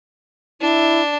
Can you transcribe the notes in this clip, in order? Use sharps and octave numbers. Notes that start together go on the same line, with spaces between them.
D4 E4